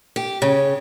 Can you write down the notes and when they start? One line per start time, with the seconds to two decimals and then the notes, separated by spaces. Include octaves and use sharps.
0.16 G4
0.42 C#3